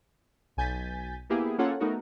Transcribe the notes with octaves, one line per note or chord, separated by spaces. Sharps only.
B1 G#5 G6 A6 B6
A#3 B3 E4 G4 G#4
A#3 C#4 F4 A4 C#5 F#5
A3 B3 D#4 F#4 A#4